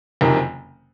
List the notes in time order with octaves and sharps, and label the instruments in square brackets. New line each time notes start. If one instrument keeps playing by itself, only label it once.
[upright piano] F#1 F2 C3 D#3